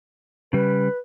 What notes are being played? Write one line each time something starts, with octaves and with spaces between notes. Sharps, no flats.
C#3 G3 B4